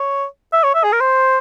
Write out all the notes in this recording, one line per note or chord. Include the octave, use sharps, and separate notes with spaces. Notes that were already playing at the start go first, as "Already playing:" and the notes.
Already playing: C#5
E5
C#5
E5
G#4
A#4
C5